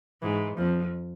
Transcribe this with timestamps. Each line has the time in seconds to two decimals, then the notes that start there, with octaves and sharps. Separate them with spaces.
0.22 G#2 E3
0.57 F2 F3